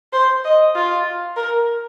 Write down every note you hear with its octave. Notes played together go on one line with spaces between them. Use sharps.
C5
D#5
F4
A#4